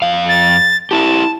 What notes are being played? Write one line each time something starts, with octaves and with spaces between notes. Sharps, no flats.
F2 F5
A6
E4 G4 A5